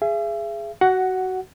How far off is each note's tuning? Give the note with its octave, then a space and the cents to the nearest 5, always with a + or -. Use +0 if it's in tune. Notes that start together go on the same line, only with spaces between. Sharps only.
G#4 +0 E5 +40
F#4 +20 F#5 +5